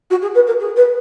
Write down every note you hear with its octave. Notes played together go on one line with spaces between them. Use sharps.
F#4
G#4
B4
A#4
G#4
B4